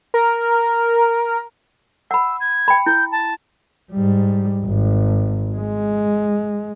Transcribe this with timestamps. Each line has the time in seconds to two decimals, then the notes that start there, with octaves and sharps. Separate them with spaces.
0.14 A#4
2.11 F#5 B5 E6
2.40 G#6
2.68 G5 B5
2.86 E4 G6
3.12 A5
3.91 G#2 G3
4.65 G#1
5.55 G#3